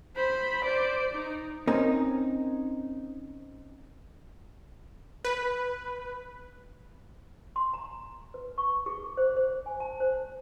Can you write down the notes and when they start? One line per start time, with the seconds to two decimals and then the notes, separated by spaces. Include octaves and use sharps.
0.16 C5 B5
0.64 C5 D5
1.14 D#4
1.68 C4 C#4 D#4 A#4 D#5
5.25 B4
7.56 C6
7.73 A#5
8.34 B4
8.58 C#6
8.86 G#4
9.17 C5
9.37 C5
9.66 G#5
9.80 A5
10.00 C5